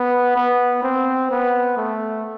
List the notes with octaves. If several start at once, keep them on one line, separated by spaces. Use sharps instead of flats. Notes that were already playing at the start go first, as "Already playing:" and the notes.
Already playing: B3
B3
C4
B3
A3